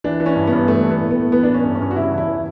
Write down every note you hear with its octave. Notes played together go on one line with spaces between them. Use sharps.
E3 D4
E3
C#4
G2
B3
G2
E3 A3
E3
B3
A2
B3
A2
E3 B3
E3 D4
C#4
G2
C#4
G2
F#4
C#3 E4
E2
E4
E3